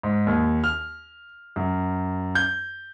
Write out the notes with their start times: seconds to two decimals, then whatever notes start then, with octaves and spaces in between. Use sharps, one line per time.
0.03 G#2
0.27 D#2
0.64 F6
1.56 F#2
2.35 G6